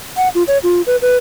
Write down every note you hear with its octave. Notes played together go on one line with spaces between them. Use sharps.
F#5
F4
C#5
F4
B4
B4